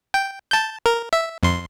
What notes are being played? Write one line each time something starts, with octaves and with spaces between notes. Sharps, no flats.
G5
A5 G6
A#4
E5
F2 C6